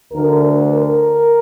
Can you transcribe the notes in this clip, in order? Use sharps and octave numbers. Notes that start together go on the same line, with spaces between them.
D2 D3 A#4
A#4